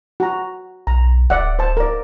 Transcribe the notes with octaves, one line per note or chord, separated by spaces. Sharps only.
F#4 A#5
B1 A#5
D1 D5 E5 F#5
C5 A5
A#4 D5